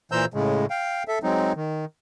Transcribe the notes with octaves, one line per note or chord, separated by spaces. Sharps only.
A#2 E3 C5 A#5 E6 G6
A2 C#3 G#3
F5 G5
A4 E5
F#3 G#3 C4 D#4
D#3